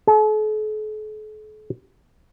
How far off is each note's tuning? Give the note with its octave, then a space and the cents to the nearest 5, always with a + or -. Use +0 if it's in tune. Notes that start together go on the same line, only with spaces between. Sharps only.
A4 -45